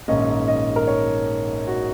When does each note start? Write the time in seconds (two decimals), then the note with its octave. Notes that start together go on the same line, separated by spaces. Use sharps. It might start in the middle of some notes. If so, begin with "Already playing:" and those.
0.08 A#1 G#2 D#3 A#3 C#4 D#5
0.48 D#5
0.76 A#4
0.87 C#5
1.67 F#4